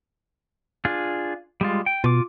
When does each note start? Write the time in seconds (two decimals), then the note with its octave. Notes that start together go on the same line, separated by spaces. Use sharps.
0.85 D4 F4 G#4
1.61 G3 G#3 F4
1.86 G5
2.04 B2 F4 D6